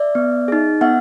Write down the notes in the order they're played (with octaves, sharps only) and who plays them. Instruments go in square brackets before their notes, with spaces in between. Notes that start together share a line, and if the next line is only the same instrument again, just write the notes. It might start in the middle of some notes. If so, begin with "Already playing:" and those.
Already playing: [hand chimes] D5 E5
B3
D#4 G#4
B3 E5 F#5